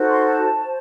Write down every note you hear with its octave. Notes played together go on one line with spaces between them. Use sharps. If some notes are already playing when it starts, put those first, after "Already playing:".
Already playing: D#4 F#4 A4 C5
C6
A5
C5